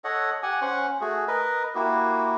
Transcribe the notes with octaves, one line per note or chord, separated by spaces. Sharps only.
A4 C#5 D#5 F#5
G4 F#5 G#5
C#4 C5 F#5 C#6
A3 F#4 G#4
A#4 B4 D#5
A#3 E4 F#4 G4